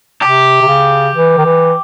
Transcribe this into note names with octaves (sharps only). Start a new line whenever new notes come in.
C3 G4
C3
C#3
E3
D#3
E3